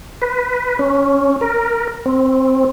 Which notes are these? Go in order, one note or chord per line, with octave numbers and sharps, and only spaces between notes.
B4
C#4
A#4
C4